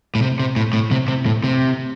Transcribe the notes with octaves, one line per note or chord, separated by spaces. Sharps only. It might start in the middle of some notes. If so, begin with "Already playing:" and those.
A2
C3
C3
A2
A2
C3
C3
A2
C3